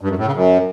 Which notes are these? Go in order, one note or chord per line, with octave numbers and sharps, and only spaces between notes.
G2
F#2
A2
C#3
F#2